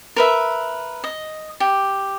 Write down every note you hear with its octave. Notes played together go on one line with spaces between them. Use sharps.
A#4 B4 E5
D#5
G4